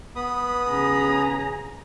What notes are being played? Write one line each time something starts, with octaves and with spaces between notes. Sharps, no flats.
B3 B5 D#6
C#3 G#4 A#5